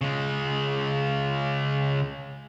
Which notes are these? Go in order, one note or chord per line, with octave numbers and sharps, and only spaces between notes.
C#3 G#3